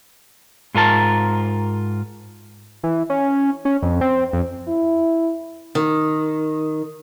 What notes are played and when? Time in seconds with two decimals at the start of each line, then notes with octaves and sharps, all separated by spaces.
0.75 G#2 F4 A#4 A5
2.83 E3
3.10 C#4
3.65 C#4
3.82 F2
4.01 C4
4.33 F2
4.68 E4
5.75 D#3